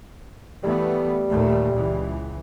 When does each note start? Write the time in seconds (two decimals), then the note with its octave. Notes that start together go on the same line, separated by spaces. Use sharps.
0.64 E3 G3 A3 B3
1.30 D#2 A#2 A3
1.74 C#2 E3